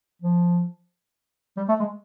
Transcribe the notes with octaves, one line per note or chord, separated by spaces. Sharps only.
F3
G3
A3
G#3